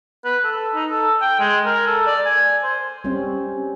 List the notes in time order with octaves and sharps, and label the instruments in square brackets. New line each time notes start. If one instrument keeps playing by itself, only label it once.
[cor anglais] B4
A4
D#4
A4
G5
G#3
A#4
A4
D5
G#5
C5
[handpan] G3 C4 C#4